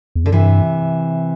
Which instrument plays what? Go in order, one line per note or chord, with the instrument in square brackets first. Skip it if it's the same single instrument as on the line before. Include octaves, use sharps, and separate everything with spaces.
[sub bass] E2
[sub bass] F#2 [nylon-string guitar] D3
[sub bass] G2 [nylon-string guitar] C3 E3